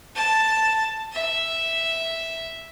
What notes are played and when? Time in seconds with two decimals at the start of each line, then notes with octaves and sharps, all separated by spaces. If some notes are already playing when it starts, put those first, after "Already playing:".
0.16 A5
1.12 E5